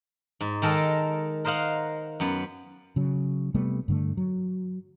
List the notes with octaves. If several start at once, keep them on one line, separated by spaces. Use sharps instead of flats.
G#2
D#3 G#3 A4 A#4 D#5
A#4 C5 D#5 F5 F#5
F#2 B3
C#3 F#3
C3 G3 A3 B3
G2 D3 A3
F#3